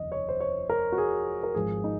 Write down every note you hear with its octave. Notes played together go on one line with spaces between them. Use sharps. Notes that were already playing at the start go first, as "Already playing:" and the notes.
Already playing: F1 D#2 C#3 D#5
C#5
C5
C#5
A#4
F#4
G#4
A#4
G#1 G#2 F3 G#4
D#4